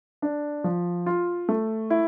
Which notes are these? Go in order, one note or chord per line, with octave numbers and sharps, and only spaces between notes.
D4
F3
F4
A3
E4